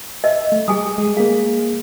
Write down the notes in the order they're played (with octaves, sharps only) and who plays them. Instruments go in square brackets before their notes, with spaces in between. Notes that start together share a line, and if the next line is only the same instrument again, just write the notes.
[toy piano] D#5 [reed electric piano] E5
[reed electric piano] A3
[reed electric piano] G3 [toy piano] G#4 G#5 D#6
[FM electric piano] G#3
[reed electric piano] A#3 G#4 [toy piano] F5